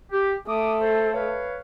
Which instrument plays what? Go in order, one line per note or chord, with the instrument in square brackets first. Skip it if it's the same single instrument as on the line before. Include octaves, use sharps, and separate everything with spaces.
[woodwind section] G4
[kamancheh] A3 [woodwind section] D6 D#6
[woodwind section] A4 C5
B4 C#5 F5